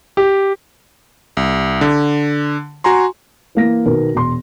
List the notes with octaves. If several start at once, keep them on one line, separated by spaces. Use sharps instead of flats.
G4
C2
D3
F#4 G#5 A#5 C6
E3 A#3 A#6
B1 D#3 B3 A#4
E1 C6